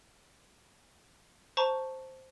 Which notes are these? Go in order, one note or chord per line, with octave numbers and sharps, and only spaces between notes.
C5 A5 A#5 C#6